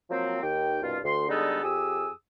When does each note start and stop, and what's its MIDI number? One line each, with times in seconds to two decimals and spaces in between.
0.10 0.42 53
0.10 0.42 54
0.10 0.42 58
0.10 0.42 60
0.43 0.79 39
0.43 0.79 51
0.43 0.79 67
0.43 0.79 79
0.82 0.98 36
0.82 0.98 43
0.82 0.98 47
0.82 0.98 65
1.04 1.24 38
1.04 1.24 84
1.29 1.61 50
1.29 1.61 55
1.29 1.61 56
1.29 1.61 59
1.29 1.61 63
1.29 1.61 69
1.63 2.09 41
1.63 2.09 67
1.63 2.09 68
1.63 2.09 87
1.63 2.09 88